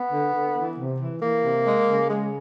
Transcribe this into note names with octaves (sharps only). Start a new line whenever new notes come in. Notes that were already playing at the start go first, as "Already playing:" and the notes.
Already playing: B3
D3
D3
E3
C3
E3
E3 A#3
C3
G#3
C#3
G#3